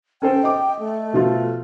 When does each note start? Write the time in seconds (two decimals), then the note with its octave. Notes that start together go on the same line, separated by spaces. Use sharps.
0.22 C#4 A4 C5 G5
0.43 D#5 D6
0.79 A3
1.13 B2 F3 F4